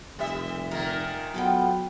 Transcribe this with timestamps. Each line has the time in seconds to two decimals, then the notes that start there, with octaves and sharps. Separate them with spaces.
0.19 F1 G3 E5
0.71 A#2 D#3 A#4
1.34 F#3 B3 F4 A4 G5